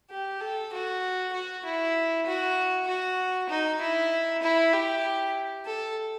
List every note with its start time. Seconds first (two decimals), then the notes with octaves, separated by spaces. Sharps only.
0.10 G4
0.40 A4
0.72 F#4
1.33 F#4
1.64 E4
2.26 F#4
2.87 F#4
3.49 D#4
3.81 E4
4.42 E4
4.73 G4
5.65 A4